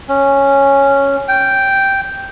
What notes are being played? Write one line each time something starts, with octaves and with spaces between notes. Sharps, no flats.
C#4
G5